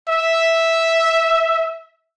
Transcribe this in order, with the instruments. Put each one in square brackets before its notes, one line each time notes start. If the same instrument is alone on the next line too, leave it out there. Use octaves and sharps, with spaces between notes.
[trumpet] E5